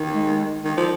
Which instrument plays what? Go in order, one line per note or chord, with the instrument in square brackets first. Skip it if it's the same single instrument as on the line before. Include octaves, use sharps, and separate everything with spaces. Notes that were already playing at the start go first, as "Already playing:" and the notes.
Already playing: [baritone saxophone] D#3
[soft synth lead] G#3
[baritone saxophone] D#3
F3